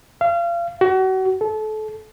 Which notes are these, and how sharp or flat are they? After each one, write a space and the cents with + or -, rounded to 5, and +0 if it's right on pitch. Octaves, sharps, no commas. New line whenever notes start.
F5 -30
F#4 +35
A4 -30